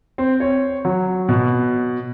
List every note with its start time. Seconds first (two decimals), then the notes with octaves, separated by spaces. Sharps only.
0.18 C4
0.40 C#5
0.85 F#3
1.29 B2